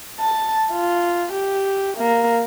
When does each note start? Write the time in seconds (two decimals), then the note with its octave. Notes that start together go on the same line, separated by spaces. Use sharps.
0.21 A5
0.72 F4
1.32 G4
1.97 A#3